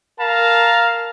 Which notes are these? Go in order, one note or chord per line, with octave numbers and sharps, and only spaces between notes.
A#4 F5 A5 A#5